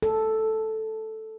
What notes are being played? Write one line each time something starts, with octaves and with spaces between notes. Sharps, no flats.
A4